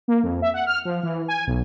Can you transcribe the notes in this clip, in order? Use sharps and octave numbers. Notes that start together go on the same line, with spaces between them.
A#3
F2
E5
F#5
F6
F3
E3
G#5
B1